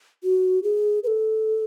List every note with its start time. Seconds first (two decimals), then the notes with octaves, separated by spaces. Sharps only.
0.24 F#4
0.63 G#4
1.03 B4
1.07 A4